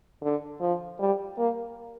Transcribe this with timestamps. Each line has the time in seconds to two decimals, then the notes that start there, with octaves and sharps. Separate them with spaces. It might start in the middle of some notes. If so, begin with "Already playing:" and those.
0.22 D3
0.60 F3
0.99 G3
1.37 A#3